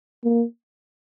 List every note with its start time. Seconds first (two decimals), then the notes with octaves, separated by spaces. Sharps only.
0.24 A#3